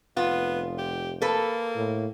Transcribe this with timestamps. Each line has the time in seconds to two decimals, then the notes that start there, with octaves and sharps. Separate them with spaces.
0.17 F1 B3 F4
0.78 G4
1.22 A#3 A4 B4
1.76 A2